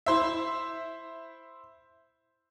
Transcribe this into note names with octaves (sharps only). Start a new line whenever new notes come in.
E4 C5 E5